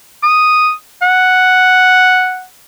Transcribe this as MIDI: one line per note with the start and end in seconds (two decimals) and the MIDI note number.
0.23 0.72 87
1.02 2.44 78